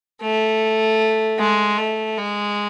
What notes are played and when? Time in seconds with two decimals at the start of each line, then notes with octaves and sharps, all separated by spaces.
0.22 A3
1.39 G#3
1.78 A3
2.18 G#3